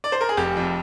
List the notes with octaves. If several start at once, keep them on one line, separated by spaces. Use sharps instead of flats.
D5
C5
A#4
G#4
F1 G4
F2